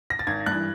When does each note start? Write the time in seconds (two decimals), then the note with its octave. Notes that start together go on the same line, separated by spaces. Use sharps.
0.10 A#6
0.19 A6
0.27 G#1 G#6
0.46 G2 F#6
0.52 E3